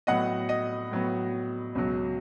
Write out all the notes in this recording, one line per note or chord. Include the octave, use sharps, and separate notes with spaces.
A2 F#3 B3 D#5 F#5
D#5
A2 F#3 B3
C#2 B2 F#3